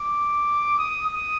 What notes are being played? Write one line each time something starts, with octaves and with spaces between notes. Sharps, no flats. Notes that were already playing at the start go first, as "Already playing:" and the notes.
Already playing: D6
D#6
D#6